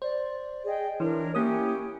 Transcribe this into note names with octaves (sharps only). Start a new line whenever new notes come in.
C5 D5
G#4 D#5 G5
E3 D4 E4 A#4 C#5
A#3 C#4 E4 G4 D#6